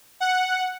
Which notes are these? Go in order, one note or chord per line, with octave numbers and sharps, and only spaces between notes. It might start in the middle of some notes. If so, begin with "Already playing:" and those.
F#5